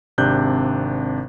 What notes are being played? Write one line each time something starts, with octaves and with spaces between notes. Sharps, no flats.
G#1 C3 D4 F#6 G6